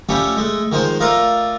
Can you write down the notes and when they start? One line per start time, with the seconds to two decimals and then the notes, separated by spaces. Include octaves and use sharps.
0.09 F3 G3 A3 C#4 G4
0.37 G#3 A3
0.72 D#3 F3 G#3 C5
1.00 A3 F4 A#4 D5 D#5 F5